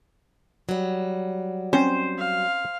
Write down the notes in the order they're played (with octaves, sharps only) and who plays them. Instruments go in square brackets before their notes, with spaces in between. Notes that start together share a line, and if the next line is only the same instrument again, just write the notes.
[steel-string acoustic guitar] F#3 G3
[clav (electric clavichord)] C4 C#4 [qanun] C5
[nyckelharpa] F5